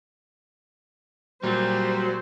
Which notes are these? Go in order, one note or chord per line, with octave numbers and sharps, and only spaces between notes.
A#2 F#3 G3 C5